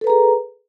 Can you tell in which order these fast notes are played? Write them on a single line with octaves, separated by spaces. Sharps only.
A4 B4 A#5 G#4